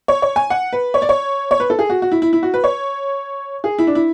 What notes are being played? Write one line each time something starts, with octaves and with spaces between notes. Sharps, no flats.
C#5
C#5
G#5
F#5
B4
C#5
D5
C#5
C#5
B4
A4
G#4
F#4
F#4
E4
E4
E4
F#4
B4
C#5
G#4
E4
D4
E4